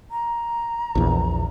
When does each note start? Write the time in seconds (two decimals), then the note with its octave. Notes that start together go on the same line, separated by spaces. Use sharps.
0.11 A#5
0.95 A#1 E2